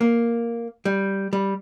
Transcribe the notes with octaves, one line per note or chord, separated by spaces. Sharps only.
A#3
G3
G3